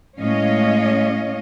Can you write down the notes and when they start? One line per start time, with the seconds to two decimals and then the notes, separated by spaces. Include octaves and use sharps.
0.19 A2 G#3 C#4 C#5 D#5 F5